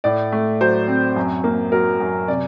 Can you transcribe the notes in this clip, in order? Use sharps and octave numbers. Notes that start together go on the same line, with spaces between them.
A2 D5
A3
F#3 C5
C4
F#2
A#3
F#3 A#4
F#2
C3 D5